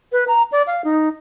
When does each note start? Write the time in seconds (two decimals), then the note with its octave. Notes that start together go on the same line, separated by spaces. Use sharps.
0.12 B4
0.28 A#5
0.52 D5
0.67 F5
0.84 D#4